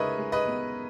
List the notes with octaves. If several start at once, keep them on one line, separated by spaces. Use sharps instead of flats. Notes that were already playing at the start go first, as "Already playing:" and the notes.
Already playing: C#3 G#3 D#4 A#4 B4 C#5 D#5 E5
G#3
B4 D#5
B3